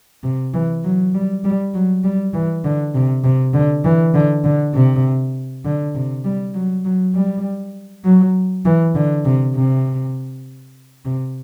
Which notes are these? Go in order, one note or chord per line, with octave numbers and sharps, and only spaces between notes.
C3
E3
F#3
G3
G3
F#3
G3
E3
D3
C3
C3
D3
E3
D3
D3
C3
D3
C3
G3
F#3
F#3
G3
F#3
E3
D3
C3
C3
C3